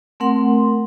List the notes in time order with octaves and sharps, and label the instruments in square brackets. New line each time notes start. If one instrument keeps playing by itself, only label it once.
[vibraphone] A3 C4 A#4 F#5 C6